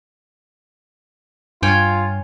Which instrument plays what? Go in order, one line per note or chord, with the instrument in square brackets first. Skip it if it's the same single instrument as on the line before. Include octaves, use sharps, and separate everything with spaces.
[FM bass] G2 [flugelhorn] F4 [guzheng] C#5 G5 G#5